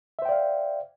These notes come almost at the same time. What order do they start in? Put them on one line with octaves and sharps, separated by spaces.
E5 C5 G5 D5 F5